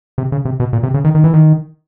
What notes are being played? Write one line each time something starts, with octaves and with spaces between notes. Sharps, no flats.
C3
C#3
C3
B2
A#2
C3
C#3
D#3
D#3
E3
D#3